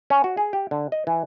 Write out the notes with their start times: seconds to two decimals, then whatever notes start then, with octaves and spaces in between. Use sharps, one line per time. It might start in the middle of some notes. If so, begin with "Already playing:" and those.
0.10 C#4
0.24 F#4
0.37 G#4
0.53 G4
0.71 D3
0.92 D#5
1.07 E3